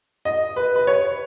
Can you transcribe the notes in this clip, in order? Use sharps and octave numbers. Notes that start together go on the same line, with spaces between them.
D#5
B4
B4
C#5